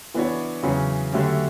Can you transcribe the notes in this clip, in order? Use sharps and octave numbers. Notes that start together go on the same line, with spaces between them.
E3 B3 D4 F#4 C#5
E2 C#3 F#3 C#4
D3 F#3 A3 C#4 G4